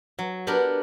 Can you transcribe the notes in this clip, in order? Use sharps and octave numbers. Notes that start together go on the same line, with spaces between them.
F#3
B3 D4 G4 A#4